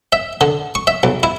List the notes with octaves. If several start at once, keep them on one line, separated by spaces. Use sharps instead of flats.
E5
D3
C#6
E5
B1
E4